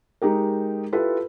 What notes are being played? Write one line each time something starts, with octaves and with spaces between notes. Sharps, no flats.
G#3 D#4 G4 A#4
E4 F4 G4 A4 B4